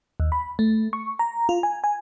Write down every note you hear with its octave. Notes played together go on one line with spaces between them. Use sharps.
D#2
B5
A3
C#6
A#5
F4
G#5
G#5